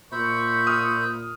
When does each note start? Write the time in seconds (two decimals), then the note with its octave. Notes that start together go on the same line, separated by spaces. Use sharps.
0.12 A#2 C5 E5 B5 C#6
0.67 D#6 F6